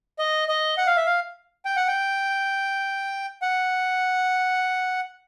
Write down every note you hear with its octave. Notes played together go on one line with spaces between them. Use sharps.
D#5
D#5
F#5
F5
E5
F5
G5
F#5
G5
F#5